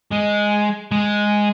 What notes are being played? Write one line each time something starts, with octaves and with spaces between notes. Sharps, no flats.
G#3
G#3